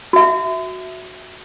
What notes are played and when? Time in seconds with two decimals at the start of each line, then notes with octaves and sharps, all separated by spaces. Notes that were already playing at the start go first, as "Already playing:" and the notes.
0.13 F#4 E5